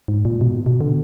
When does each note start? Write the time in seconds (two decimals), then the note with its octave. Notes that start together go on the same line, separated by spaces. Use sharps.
0.08 G#2
0.25 A#2
0.41 B2
0.66 B2
0.81 D3